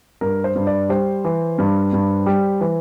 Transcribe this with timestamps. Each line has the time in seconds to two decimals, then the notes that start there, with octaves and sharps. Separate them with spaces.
0.21 G2 A#4
0.44 C5
0.55 G2
0.67 D5
0.89 G3 C5
1.25 E3
1.58 G2
1.93 G2
2.26 G3
2.61 E3